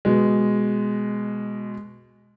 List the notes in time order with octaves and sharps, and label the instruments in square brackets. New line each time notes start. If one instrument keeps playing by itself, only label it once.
[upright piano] B2 G#3